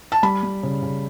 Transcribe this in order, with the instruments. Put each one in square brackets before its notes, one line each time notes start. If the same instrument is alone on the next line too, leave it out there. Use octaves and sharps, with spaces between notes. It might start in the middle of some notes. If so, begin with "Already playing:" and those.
[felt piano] A5
G3 B5
G3
C#3
C#3